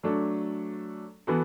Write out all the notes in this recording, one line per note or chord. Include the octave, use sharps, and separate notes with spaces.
F#3 A3 D4 A4
E3 B3 F#4 A4